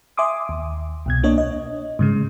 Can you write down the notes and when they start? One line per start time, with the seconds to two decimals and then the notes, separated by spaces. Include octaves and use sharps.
0.17 E5 G#5 C6 D6 D#6
0.49 D#2
1.06 C2 B2 G#6
1.23 A#3 D4 C#5 D#5
1.38 D#5
1.99 G#2 C#3 G#3